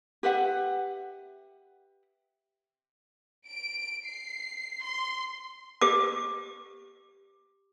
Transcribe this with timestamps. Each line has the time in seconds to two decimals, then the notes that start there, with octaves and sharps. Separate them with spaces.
0.23 G4 B4 E5 F#5
3.48 D7
4.05 C7
4.84 C6
5.81 G4 D6